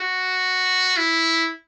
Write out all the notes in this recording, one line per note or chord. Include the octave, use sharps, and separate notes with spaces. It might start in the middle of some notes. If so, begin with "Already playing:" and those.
Already playing: F#4
E4